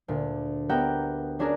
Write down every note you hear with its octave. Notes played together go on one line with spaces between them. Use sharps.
D2 A#2
B3 G4 A#4 E5 F#5 G5
C#4 D4 F#4 G#4 A#4